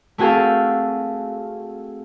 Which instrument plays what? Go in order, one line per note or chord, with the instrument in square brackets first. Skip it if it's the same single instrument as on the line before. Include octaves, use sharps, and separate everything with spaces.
[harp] A3 C4 F#4 G#4 A4 F5